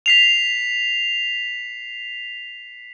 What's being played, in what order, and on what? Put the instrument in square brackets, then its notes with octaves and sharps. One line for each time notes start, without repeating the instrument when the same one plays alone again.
[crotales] B6 C7 F7